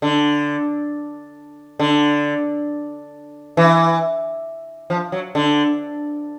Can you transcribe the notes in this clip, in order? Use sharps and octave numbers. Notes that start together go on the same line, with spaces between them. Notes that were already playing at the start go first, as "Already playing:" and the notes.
D3
D3
E3
F3
F#3
D3